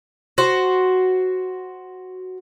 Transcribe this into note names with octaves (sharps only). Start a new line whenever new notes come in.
F#4 C5